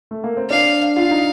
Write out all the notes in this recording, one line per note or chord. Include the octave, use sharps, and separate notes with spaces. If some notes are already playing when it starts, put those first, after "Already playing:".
A3
A#3
C4
D4 F5
F4 F5
D#4